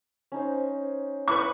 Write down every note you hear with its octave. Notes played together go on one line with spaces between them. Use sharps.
C#4 D#4 C5
E4 B4 C#6